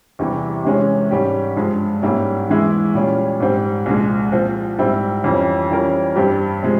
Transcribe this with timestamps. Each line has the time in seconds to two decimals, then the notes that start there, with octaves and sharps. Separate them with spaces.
0.19 E2 C3 E3 G3
0.65 C3 E3 G#3 C#4
1.11 G#2 G3 C#4 G4
1.57 G2 F3 G#3
2.02 G#2 G3 A#3 C#4 E4
2.49 E2 E3 G#3 E4
2.94 A#2 G3 C#4 F4
3.40 G#2 G3 C4 G4
3.86 C2 A#2 F3 G#3
4.32 A#2 F3 C4 F4
4.78 G#2 G3 C4 E4
5.24 F2 E3 G3 C#4 F4
5.70 E3 G3 C#4 F4 A#4
6.16 G2 G3 C4 G4
6.63 C3 F3 G#3